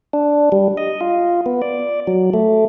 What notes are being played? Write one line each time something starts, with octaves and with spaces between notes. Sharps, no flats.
D4
G3
D#5
F4
B3
D5
F#3
A3